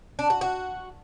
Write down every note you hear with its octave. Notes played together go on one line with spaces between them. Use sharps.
D4
F#4
F#4